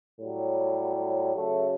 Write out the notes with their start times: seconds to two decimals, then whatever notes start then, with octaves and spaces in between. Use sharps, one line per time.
0.19 A2 F#3 G3
1.34 C#3 F#3 A3